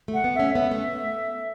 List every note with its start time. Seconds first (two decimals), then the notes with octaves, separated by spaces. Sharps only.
0.08 A3
0.14 F#5
0.24 B3
0.35 C#4 E5
0.55 B3 E5
0.71 A3